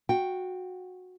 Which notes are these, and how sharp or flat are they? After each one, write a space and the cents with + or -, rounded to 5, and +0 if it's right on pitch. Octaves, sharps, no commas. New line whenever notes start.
F#4 -15 G5 +0